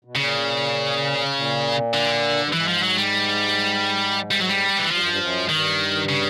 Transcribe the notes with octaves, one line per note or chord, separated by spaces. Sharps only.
B2
A#2 C#3
A#2
D3
G2
G#2 E3
F3
F#3
G3
G3
F#3
G3
E3
G2 F3
F#2
G2
F#2
G#2
G2 D#3
C#3